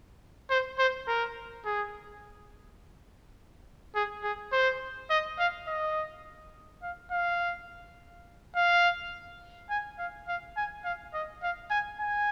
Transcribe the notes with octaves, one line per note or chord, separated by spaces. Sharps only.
C5
C5
A#4
G#4
G#4
G#4
C5
D#5
F5
D#5
F5
F5
F5
G#5
F5
F5
G#5
F5
D#5
F5
G#5
G#5